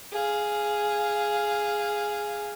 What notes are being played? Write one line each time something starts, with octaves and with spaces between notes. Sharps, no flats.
G#4 F5